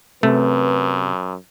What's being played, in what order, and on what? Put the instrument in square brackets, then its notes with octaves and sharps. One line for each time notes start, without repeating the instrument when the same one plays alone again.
[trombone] F#2 [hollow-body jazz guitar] C3 [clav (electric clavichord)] A3 [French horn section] B4